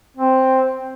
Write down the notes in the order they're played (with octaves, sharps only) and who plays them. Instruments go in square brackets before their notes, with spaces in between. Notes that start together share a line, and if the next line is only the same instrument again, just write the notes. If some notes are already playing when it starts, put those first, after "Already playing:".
[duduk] C4